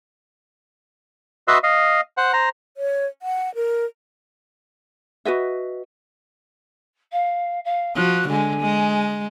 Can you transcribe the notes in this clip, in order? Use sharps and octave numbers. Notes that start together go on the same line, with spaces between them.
F#4 B4 D#5 E5 C6 E6
D#5 F5
C5 F#5
C5 A#5
C#5
F#5
A#4
F#4 B4 D#5 E5
F5
F5
F3 F#4 F#6
D3 G#3 G#5
G#3